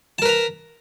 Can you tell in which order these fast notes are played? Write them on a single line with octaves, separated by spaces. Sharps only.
A5 A#4 B4 A#5